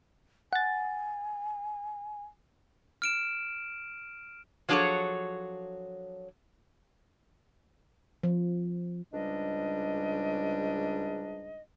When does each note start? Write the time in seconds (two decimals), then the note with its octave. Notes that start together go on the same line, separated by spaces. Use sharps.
0.53 F#5 G#5 A6
3.02 F6 D7 E7
4.69 F3 F#3 D4 G#4 A4 C#5
8.23 F3
9.13 C#2 G#2 G3 D4 D#5